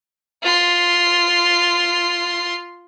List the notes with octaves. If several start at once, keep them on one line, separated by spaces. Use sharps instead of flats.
F4 C6